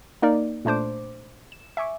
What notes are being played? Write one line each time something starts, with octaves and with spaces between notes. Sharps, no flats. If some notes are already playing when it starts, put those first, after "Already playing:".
A#3 D#4 A#4 D5
A#2 A3 D4 C5 D6
E7
E5 G#5 C#6 D6